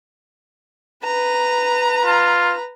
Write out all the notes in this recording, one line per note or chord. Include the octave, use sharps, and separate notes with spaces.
B4 A#5
F4